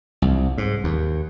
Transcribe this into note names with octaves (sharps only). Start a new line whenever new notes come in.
C2
G#2
D#2